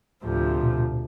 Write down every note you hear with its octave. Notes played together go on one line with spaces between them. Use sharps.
D2 A2 C3 F3
A#2
B2